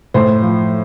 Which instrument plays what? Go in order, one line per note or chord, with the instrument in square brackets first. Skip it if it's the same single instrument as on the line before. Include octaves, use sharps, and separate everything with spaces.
[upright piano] A2 C5
F3